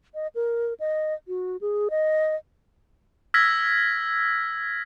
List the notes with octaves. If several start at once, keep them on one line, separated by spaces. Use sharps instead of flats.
D#5
A#4
D#5
F#4
G#4
D#5
E6 F6 G#6 A#6 B6